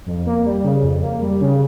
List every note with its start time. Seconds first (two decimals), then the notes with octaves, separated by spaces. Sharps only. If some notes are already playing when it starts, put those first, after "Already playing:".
0.06 F2
0.26 A#3
0.45 G3
0.64 C#3
0.83 F2
1.02 A#3
1.21 G3
1.41 C#3